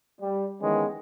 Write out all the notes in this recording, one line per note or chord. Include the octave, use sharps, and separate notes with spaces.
G3
D#3 E3 G#3 B3 C#4